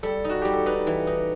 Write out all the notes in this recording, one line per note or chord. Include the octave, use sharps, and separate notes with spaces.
G3 A4
D#4 F#4
G3 G4
A4
D#4 B4
E3
D#4